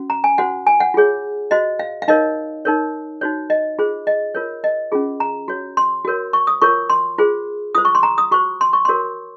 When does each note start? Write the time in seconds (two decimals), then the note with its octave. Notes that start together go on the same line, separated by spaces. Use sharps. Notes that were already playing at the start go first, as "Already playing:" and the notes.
Already playing: C#4 F#4
0.10 A#5
0.24 G#5
0.38 F#4 C5 F#5
0.67 G#5
0.80 F#5
0.94 F4 G#4 C#5
1.51 F#4 C5 D#5
1.79 F5
2.02 F5
2.08 D#4 A#4 C#5 D#5
2.65 D#4 A#4 C#5
3.21 D#4 F#4 C5 C#5
3.50 D#5
3.79 F4 G#4 C5
4.07 D#5
4.35 F4 A#4 C#5
4.64 D#5
4.92 C#4 F4 G#4
5.20 A#5
5.48 F#4 C#5
5.77 C6
6.05 F#4 A#4 C#5
6.33 C#6
6.47 D#6
6.62 F4 A#4 C#5 C#6
6.90 C6
7.18 F4 G#4 C5
7.75 F4 C5 D#6
7.85 C#6
7.95 C6
8.03 A#5
8.18 D#6
8.31 F#4 C5 C#6
8.61 C6
8.73 C#6
8.85 F#4 A#4 C#5 C6